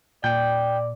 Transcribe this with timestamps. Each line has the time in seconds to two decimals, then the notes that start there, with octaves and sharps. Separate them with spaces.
0.24 A#2 D5 G5